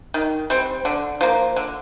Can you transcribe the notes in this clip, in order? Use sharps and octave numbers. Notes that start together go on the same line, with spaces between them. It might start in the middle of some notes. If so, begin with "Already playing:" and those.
D#3
G3 C4
D3
F3 A#3
D3